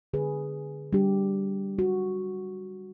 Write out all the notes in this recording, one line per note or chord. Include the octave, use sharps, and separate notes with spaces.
D3 G#4 B4
G3 D4 G4
F#4